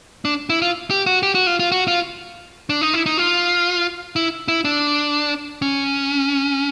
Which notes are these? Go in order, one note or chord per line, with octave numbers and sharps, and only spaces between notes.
D4
E4
F4
G4
F#4
G4
F#4
F4
F4
F#4
F4
D4
D#4
E4
D#4
F4
E4
E4
D4
C#4